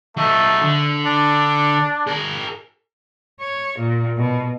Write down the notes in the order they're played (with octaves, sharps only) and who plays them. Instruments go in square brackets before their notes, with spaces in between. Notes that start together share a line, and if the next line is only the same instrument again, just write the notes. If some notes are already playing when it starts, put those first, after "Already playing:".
[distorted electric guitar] F#3 D#5 [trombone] A3
[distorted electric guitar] D3
[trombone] D4
[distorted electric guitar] G#4 A#4
[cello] C#5
A#2
B2